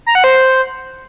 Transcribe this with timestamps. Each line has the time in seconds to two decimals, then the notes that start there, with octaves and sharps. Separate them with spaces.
0.06 A#5
0.15 F#5
0.24 C5